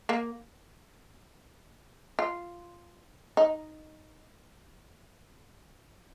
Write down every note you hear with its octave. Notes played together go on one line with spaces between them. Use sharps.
A#3
F4
D#4